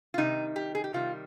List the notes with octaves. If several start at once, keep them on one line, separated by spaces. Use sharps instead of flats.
F4
C3 D#3 G3 D#4
G4
G#4
G4
C3 D#3 G3 F4